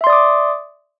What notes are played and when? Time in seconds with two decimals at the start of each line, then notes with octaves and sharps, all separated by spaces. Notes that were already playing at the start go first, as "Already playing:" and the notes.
0.01 E5
0.04 C6
0.07 D5
0.10 D#6
0.13 D6